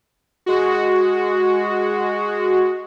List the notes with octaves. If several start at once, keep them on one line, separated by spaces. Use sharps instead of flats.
G#3 F#4